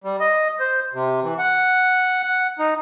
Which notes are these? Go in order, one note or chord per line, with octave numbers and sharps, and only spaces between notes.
G3
D#5
C5
C3
E3
F#5
F#5
D#4